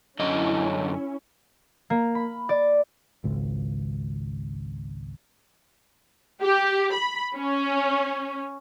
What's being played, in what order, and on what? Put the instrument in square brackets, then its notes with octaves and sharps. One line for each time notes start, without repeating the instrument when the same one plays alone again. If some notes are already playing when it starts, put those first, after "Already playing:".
[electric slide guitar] F#2 D3 D#5 [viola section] C#4 E4
[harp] A#3
B5
D5
[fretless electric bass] G#1 C#2
[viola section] G4
B5
C#4